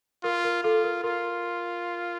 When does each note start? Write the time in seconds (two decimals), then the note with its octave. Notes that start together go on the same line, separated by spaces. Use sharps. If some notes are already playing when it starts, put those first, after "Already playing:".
0.24 F4 A#4
0.44 A#4
0.63 F4 A4
0.84 A#4
1.03 F4 A#4